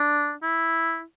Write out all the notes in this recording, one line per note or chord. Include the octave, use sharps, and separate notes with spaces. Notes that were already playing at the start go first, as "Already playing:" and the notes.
Already playing: D4
E4